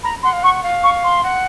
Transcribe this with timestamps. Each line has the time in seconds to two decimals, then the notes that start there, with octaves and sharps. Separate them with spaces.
0.03 A#5 B5
0.23 F#5 C6
0.33 F5
0.43 F#5 C#6
0.63 F5
0.84 C#6
1.04 C6
1.23 F#5